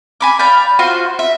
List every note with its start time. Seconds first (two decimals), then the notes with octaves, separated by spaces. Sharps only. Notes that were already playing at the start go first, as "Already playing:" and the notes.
0.21 G#5 B5 D6
0.39 D5 F5 G5 B5
0.79 F4 F#4 C5 C6
1.19 E5